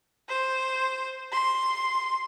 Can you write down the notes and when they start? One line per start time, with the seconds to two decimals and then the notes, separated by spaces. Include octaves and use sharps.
0.29 C5
1.32 C6